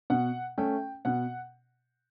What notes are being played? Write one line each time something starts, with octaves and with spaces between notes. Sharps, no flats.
B2 F#5
A3 C#4 G5
B2 F#5